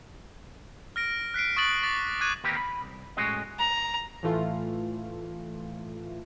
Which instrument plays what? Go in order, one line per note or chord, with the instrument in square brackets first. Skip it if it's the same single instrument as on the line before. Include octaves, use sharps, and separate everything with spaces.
[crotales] F6 A#6 D7
F#6 B6 C7 D7
C#6 D#6 F6 A6 D7 F#7
D6 A6 B6
D6 F#6 G#6 D7 D#7
[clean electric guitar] D#2 A#3 C4 G4 A#4 B4
B5
C2
A2 G#3 C#4 F#4 D#5
[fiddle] A#5
[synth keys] A2 E3 A3 F4